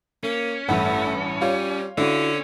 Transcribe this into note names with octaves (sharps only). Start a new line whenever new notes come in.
A#3 C#4
A1 G2 A3 F#5
G3 F4 C#5
D3 C#4 E4 F#4